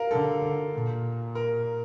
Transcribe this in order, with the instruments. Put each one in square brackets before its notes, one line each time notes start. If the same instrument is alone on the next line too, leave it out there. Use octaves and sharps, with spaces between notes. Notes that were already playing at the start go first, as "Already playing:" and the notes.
Already playing: [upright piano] A#4 F5
[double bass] D3 [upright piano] A4
[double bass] A#2
[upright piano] A#4